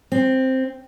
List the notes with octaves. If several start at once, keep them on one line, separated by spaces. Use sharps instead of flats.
C4